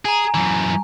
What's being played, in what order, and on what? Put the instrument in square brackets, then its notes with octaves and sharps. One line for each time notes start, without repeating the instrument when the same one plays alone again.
[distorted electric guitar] G#4 [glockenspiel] G#5 A#5
[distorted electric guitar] F#2 E3